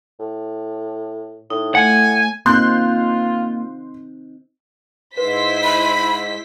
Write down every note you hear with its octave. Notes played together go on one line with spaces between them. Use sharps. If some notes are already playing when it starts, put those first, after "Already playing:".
A2
A2 D#4
A3 F#5 G#5
A#3 C4 D#4 F4 C6 F#6 G6
G#2 E4 B4 C5 B6
B5